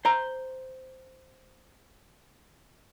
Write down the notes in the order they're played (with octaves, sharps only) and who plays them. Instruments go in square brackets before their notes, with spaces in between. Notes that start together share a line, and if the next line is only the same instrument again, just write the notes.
[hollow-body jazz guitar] C5 A#5